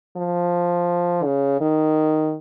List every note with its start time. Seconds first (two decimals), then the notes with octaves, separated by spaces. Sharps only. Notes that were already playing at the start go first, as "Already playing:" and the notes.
0.17 F3
1.24 C#3
1.61 D#3